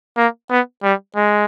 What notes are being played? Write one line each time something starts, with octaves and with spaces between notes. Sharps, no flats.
A#3
B3
G3
G#3